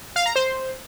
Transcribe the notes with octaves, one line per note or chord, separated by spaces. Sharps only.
F5
A#5
C5